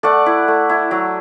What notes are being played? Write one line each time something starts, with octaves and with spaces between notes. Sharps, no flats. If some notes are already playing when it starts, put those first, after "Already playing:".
A3 D5 F#5
E4
A3
E4
F#3